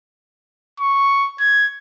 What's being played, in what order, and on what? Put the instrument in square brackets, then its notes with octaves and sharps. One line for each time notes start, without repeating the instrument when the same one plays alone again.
[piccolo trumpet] C#6
G#6